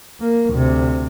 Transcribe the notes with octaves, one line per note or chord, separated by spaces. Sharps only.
A#3
D2 C3